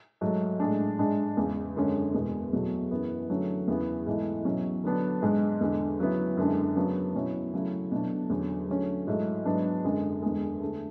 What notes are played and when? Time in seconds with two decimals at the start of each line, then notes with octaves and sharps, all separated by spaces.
0.21 G#2 F#3 A3
0.60 A2 G#3 D4
0.99 G#2 G#3 D4
1.37 E2 C#3 G#3
1.76 F#2 D3 G#3 C#4
2.14 E2 B2 G#3
2.53 E2 B2 F#3 A3
2.91 F#2 E3 B3 E4
3.29 D3 F#3 A3 C#4
3.68 E2 C#3 E3 B3 E4
4.07 G#2 E3 A3 E4
4.45 B2 F#3 C#4
4.84 D3 F#3 B3 D4
5.22 G#2 G#3 D4
5.61 E2 D3 G#3
5.99 C#3 F#3 B3 E4
6.37 F#2 D3 G#3 D4
6.76 C#3 F#3 B3 D4
7.15 B2 F#3 C#4 E4
7.53 C#3 F#3 A3 E4
7.92 B2 F#3 A3 D4
8.30 E2 D3 F#3 C#4
8.69 D3 F#3 A3 C#4
9.07 G#2 F#3 A3 E4
9.45 G#2 F#3 B3 D4
9.84 F#2 D3 G#3
10.23 E2 D3 G#3
10.61 D3 A3